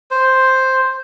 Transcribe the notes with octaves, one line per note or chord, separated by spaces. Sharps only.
C5